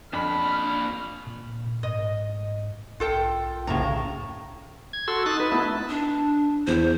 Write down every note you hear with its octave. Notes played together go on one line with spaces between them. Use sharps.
F2 A#2 D4 B5 F6
A#2
G#2 D#5
B1 F4 A4 G5
D2 A2 C#3 A#5
G#6
F#4 A4 C6 E6
D#4 F#6 A6
D#4 B4
A3 B3 D#4 E4
D4
E2 C5